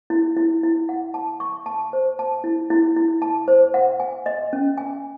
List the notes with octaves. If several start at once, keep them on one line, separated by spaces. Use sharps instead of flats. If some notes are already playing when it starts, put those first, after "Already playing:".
E4
E4
E4
F#5
A5
C#6
A5
C5
A5
E4
E4
E4
A5
C5
F#5
G#5
D#5
C#4
G#5